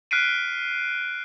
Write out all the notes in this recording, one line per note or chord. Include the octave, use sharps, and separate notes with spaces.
F6 F#6 B6 C7 D7 D#7